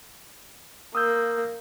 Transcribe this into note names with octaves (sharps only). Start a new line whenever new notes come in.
A#3 D#6 E6 G6